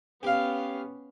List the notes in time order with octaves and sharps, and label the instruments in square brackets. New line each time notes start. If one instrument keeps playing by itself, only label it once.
[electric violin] B3 C#4 [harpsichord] G4 F5